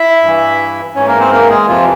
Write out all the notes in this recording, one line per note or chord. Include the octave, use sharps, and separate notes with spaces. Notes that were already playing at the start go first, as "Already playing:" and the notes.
Already playing: E4 E5
G2 E3
G#2 E3 C#4 C#5
A#3 A#4
C4 C5
A#3 A#4
G#3 G#4
F2 C3 E3 F3 F4